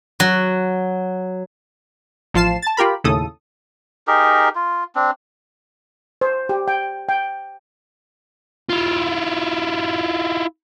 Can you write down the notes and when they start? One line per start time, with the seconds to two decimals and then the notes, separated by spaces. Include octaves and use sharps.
0.20 F#3
2.34 A1 F3 F4 A5 C7 E7
2.62 A5 A6
2.77 F4 G4 A#4 B5
3.04 D#2 A2 C#3 A4 D#6
4.07 D#4 G4 G#4 A#4
4.55 F4
4.95 C4 D4
6.21 C5
6.49 G4
6.68 G5
7.09 G5
8.69 E4 F4